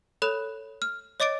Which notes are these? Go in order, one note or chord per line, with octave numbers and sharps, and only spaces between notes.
A4 C#5 B5 F#6 E7 F7
F6
C#5 D#5 D6 A6 D7